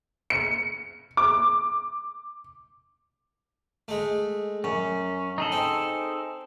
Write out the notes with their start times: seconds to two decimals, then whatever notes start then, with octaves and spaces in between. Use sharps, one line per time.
0.30 C#7
1.17 D6
3.88 G#3 A3
4.64 F#2 C#4
5.38 D#4 G#4 A4
5.52 C4